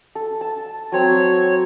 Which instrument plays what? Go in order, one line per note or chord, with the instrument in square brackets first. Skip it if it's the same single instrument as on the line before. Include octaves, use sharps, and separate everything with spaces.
[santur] A4
A5
[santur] F#3 C4 [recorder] C#5